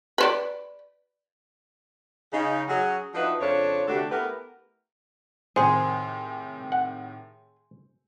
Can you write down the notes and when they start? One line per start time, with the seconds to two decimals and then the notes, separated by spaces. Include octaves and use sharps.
0.18 B4 C5 D5
2.33 C#3 D#4
2.69 F#3 C#4 G#4
3.14 F3 D4 D#4 F#4 B4 E5
3.40 F2 C#3 D4 C5 C#5
3.88 D2 C3 D4 F#4 G4 A4
4.11 A3 B3 E4 G4 A#4 B4
5.56 A2 C3 D#3 G#4 C5 G#5 C6
6.72 F#5